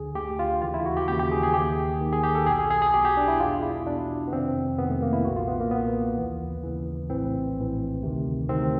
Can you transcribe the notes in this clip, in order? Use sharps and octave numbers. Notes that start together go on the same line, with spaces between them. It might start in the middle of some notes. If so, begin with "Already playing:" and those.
Already playing: D2 D3 G#4
D2 D3 G4
F4
D#2 C#3 E3 F4
E4
F#4
G4
D#2 C#3 E3 G4
G4
G#4
G#4
D#2 D#3 G4
D#2 D#3
G#4
G4
A4
B1 B2 G#4
G#4
G#4
G#4
B1 B2 G4
G4
D4
E4
E2 B2 F4
E4
E2 B2 D4
B3
F2 C3 D#3 C4
F2 C3 D#3 B3
A3
A#3
E4
B1 A#2 F#4
F4
B3
A#3
B1 A#2 B3
D#2 C#3 E3
D#2 C#3 E3
A#1 A2 E3 C4
A#1 A2 E3
D2 C3 D#3
D2 C3 D#3 C4